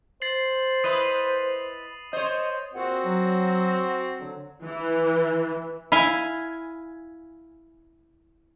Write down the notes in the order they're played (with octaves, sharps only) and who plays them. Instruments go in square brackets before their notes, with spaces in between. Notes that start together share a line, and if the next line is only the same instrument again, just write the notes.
[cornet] C5 [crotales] A6 C7 F#7
[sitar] E4 B4 D#5 [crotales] D#6 C7 D#7
[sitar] C5 C#5 [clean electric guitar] D#5
[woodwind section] A#2 G#4 F#5 [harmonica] C4 F#4
[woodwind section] F#3
D3 F#3
[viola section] E3
[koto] E4 F5 G#5